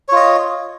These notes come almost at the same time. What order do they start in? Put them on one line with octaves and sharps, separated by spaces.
C#5 F4 D#5